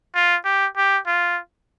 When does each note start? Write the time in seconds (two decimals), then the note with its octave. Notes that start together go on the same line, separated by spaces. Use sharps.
0.15 F4
0.45 G4
0.77 G4
1.07 F4